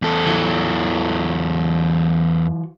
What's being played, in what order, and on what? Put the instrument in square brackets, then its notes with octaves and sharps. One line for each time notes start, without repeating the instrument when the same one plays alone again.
[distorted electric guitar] E2 A4
[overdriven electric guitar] E3 F#3